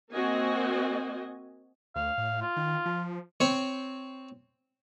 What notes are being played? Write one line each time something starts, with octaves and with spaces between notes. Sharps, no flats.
A#3 C4 F#4 D#5 G#5
D2 F5
A2
F4
D#3
F3
C4 C#5